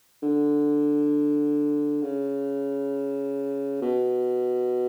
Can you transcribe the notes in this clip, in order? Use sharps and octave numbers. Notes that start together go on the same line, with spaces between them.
D3
C#3
B2